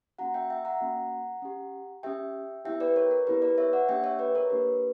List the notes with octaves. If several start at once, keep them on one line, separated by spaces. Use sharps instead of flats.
A#3 C#4 F#4 F#5 A#5
E5 G5
E5 G5
F#5 A#5
A#3 C#4 F#4
C#4 G4
C#4 G4 E5 G5
B3 E4 G4 E5 G5
B4 D5
A#4 C#5
A#4
B3 E4 G4 B4
B4 D5
C#5 E5
D5 F#5
A#3 D4 G4 E5 G5
C#5 E5
B4 D5
A#4 C#5
A#3 D4 G4 B4